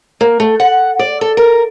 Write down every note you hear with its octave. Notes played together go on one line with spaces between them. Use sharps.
A#3
A3
F#5
D5
A4
A#4